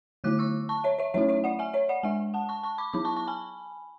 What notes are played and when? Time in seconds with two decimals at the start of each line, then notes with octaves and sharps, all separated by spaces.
0.24 D3 F#3 A3 E4 D6 F#6
0.39 C#6 E6
0.69 A5 C#6
0.84 C#5 E5
0.99 C#5 E5
1.14 F#3 A3 C#4 E4 C#5 E5
1.29 C#5 E5
1.44 D5 F#5
1.59 E5 G#5
1.73 C#5 E5
1.89 D5 F#5
2.03 G#3 D4 E5 G#5
2.34 F#5 A5
2.49 A5 C#6
2.63 A5 C#6
2.78 B5 D6
2.93 F#3 B3 E4 B5 D6
3.05 A5 C#6
3.16 A5 C#6
3.27 G#5 B5